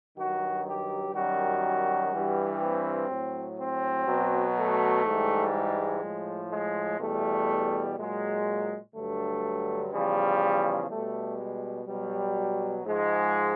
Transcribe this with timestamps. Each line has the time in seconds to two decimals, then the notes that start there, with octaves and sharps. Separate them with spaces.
0.16 G2 D#3 F#3 F#4
0.66 G4
1.14 F#2 D#3 G3 F#4
2.11 G2 E3 G3
2.61 C4
3.09 A2 F#3
3.58 C4
4.06 B2 F#3
4.56 A3
5.05 G#2 E3 G3
5.53 G#3
6.02 A2 F3
6.50 G#3
6.99 E2 B2 G3 A3
7.97 A#2 F#3 G#3
8.94 G2 D3 F#3 A3
9.92 E2 C#3 F3 G3
10.90 B2 G3 A3
11.39 G#3
11.87 B2 F#3 G3
12.85 G#2 F3 G#3